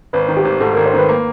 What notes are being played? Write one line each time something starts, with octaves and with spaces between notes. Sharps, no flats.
G#1 B4
D#3
G4
G#1
G#2 A4
G#1 A#4
C5
D#3 B4
A#3